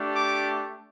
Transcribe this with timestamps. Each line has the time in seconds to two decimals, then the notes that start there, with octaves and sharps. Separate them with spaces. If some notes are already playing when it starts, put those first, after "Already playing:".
Already playing: A3 D4 G4
0.15 D6